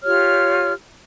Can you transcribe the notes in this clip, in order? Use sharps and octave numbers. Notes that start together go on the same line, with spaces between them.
F4 G4 C#5 F6